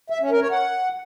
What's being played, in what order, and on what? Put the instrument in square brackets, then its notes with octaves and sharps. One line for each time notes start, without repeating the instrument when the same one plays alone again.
[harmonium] E5
C#4
A#4
C#5
F#5